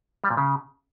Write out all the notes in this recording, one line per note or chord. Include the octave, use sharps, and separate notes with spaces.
G3
A#2
C#3